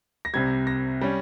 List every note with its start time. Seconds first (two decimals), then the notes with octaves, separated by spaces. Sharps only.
0.25 A#6
0.34 C2 C3 G3 G#6
0.67 A#6
1.01 G3 C#4